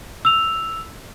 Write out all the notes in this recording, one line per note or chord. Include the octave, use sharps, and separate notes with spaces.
E6 F7